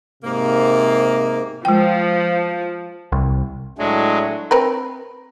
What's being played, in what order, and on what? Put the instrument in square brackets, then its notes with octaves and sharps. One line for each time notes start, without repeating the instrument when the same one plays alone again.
[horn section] G#2 C3 A#3
[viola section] F3 [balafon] G#3 G5
[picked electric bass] C2
[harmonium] A2 A3 D4 [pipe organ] F#3 G#3
[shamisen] C4 A#4 B4